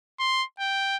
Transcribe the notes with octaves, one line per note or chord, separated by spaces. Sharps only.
C6
G5